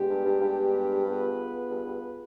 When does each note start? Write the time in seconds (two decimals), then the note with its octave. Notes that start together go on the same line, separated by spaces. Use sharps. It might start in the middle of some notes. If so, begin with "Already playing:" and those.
Already playing: B2 G#3 B3 D4 G4
0.09 G2
0.25 G2
0.41 G2
1.06 B3 F4 G#4 B4
1.70 G2
1.86 G2